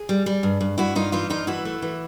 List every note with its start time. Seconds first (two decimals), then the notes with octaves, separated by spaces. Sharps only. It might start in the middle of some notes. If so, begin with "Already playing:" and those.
Already playing: G#4
0.09 G3
0.26 G3
0.43 G2
0.61 G2
0.78 G2 E4 F#4
0.95 G2 D#4 F4
1.12 E3 D#4 F4
1.30 G2 D#4 F4
1.47 E3 E4 F#4
1.65 A3
1.82 E3